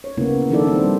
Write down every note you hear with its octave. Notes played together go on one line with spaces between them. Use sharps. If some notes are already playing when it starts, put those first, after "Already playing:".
C#5
C#3 A#3 B3 E4
D#3 F3 D4 E4 A4 D5
G3 C4